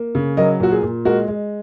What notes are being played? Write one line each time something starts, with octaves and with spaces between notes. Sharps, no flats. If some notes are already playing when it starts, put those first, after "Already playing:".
Already playing: A#3
C#3
F#3 A#4 D#5
A#2 F#4
G#4
A#2
G#3 F#4 A#4
G#3